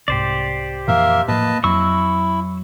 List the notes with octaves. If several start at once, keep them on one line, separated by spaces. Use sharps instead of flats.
C2 G#2 G4 C5 D5
F2 A#2 E3 A#3 A#4 E5
A2 F3 A#3 B4 D#5 A5
F2 F#3 E4 C#6 E6